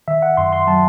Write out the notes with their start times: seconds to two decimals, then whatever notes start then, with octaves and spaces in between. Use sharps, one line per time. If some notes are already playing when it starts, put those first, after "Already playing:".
0.08 D#3 E5
0.22 F#5
0.37 F#2 C6
0.53 C6
0.68 F#3 A5